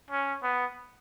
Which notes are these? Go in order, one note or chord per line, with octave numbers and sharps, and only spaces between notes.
C#4
B3